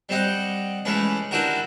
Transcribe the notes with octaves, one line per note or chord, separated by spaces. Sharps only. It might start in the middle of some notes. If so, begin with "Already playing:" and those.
G3 C4 G4 D#5 F#5
E3 G#3 A3 C#4 B4
D4 E4 F#4 G4 A#4